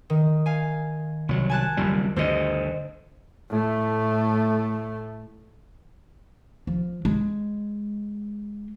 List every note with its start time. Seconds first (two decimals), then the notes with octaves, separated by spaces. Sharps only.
0.10 D#3
0.46 F5 G#5
1.29 C2 F#3
1.49 G#5 A5 F#6
1.77 F#1 F2 G3
2.16 D2 G2 D3 C5 D#5
3.49 A2 A3
6.67 F3
7.05 G#3